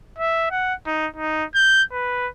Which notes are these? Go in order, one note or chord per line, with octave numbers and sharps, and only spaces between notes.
E5
F#5
D#4
D#4
G6
B4